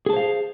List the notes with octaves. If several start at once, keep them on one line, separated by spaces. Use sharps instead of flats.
G#4 C5 F5 A5